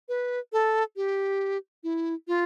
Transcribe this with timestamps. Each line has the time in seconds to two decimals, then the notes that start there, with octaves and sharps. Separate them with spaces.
0.09 B4
0.53 A4
0.96 G4
1.84 E4
2.28 F4